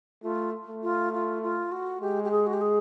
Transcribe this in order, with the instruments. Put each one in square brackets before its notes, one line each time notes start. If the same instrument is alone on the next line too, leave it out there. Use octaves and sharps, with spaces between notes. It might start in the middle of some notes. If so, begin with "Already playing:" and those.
[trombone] A3 [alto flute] F4
[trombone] A3
[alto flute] F4
F4
F4
F#4
[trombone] G#3 [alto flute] G4
[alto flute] G4
G#4
F#4
G4
G#4